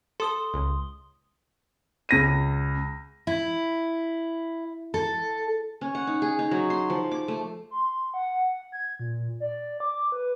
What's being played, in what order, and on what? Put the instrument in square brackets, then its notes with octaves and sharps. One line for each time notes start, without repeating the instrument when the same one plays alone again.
[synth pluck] A4 [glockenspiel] C6 D#6 G7
[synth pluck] C#2
[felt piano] C#2 A#6 D#7
[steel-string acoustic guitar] E4
A4
[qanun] C#4
F#5
D#4
G#4
D#4
F#3
C6
F3
D6
A3
[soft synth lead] C6
F#5
G#6
A#2
D5
D6
B4